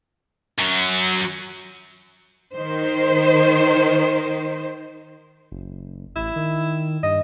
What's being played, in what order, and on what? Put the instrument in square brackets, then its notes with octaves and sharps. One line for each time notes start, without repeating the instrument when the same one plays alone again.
[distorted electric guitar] F#2 F#3
[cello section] D#3 C5
[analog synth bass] F#1
[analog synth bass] A1 [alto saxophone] E4
[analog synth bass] D#3
[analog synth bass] G2 [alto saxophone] D#5